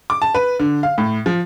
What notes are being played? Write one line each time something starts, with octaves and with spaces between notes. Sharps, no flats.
D6
A5
B4
D3
F5
A2
F3